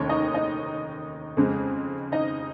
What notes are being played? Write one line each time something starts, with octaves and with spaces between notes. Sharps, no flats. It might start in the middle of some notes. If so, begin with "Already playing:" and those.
Already playing: F1 D#2 D#3 C#4 C#5
D#4 D#5
D#4 D#5
F2 C#3 G#3
D#4 D#5